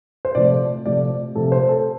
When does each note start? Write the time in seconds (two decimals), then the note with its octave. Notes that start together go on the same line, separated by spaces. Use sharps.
0.25 C5
0.35 C3 F3 A3 D5
0.86 C3 F3 A3 D5
1.35 C3 F3 A3 A4
1.52 C5
1.69 A4